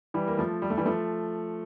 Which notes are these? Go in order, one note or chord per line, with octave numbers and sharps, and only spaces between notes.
E3 G3
A#3
F3 A3
G3
A3
E3 G3
F3 A3